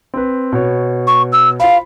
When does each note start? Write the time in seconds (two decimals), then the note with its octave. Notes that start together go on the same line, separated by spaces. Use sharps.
0.14 C4 B4
0.52 B2 B3 C#5
1.07 C#6
1.32 E6
1.60 F4 C5 F5 B5